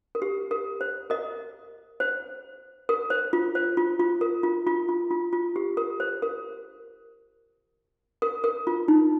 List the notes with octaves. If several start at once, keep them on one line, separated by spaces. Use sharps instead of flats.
A#4
G4
A#4
C5
A#4 D#5
C5
A#4
C5
F4
C5
F4
F4
A#4
F4
F4
F4
F4
F4
G4
A#4
C5
A#4
A#4
A#4
F4
D#4